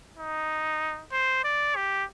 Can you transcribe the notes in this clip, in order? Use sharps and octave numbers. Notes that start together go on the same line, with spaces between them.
D#4
C5
D5
G4